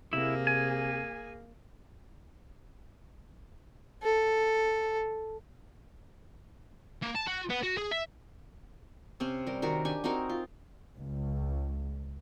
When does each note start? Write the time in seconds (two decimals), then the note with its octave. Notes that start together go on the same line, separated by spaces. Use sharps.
0.13 C3 A#3 E4 G#4
0.47 G#5
4.03 A4
7.03 A#3
7.16 A5
7.27 F#4
7.50 B3
7.63 F#4
7.77 G#4
7.91 E5
9.20 C3 C4 C#4
9.46 G3 A#4
9.62 D#3 F#4 A#4
9.85 D4 G4 G#5
10.04 C4 D#4 F#4 A#4
10.29 F4
10.96 C#2